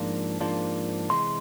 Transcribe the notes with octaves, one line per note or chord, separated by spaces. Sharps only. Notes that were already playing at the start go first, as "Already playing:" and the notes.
Already playing: G#2 F3 A#3 D4 F4
G#2 F3 A#3 D4 F4
C3 E3 G#3 C6